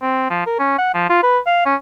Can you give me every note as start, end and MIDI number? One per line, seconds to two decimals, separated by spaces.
0.01 0.29 60
0.30 0.47 53
0.47 0.56 70
0.59 0.76 61
0.78 0.93 78
0.94 1.09 53
1.10 1.21 65
1.23 1.39 71
1.46 1.62 77
1.66 1.75 61